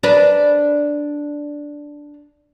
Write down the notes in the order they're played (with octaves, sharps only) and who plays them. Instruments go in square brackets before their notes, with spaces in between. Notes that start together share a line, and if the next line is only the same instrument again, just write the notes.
[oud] D4 A#4 B4